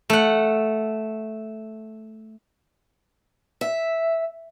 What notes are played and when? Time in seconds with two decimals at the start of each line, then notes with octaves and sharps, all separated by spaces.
0.10 A3 F#5
3.61 E5